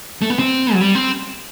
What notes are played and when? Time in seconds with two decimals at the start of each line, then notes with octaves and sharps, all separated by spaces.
0.22 A3
0.30 B3
0.39 C4
0.73 F#3
0.81 G3
0.95 C4